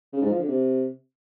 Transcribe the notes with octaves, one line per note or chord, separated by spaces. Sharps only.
C#3
G#2
F3
D3
C3